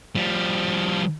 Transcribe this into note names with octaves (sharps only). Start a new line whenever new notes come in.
F3 G3